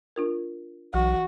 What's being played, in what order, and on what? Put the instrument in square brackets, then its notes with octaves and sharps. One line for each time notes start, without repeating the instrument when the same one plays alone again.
[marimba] D4 F4 A#4
[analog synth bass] B1 [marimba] E3 [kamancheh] F#4